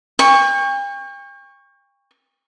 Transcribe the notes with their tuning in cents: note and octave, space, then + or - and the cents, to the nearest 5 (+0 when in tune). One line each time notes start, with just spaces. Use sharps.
G5 +40 C#6 +0